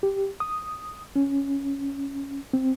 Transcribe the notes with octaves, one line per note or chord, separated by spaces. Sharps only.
G4
D#6
C#4
C4